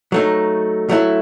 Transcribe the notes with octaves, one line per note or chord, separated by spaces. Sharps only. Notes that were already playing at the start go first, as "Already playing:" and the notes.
F#3 A3 D#4
F#3 A3 E4